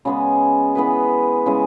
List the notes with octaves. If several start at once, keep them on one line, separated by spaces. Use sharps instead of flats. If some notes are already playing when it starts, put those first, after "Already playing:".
C#3 G#3 B3 G#4
E3 B3 G#4 B4
C#3 G#3 E4 G#4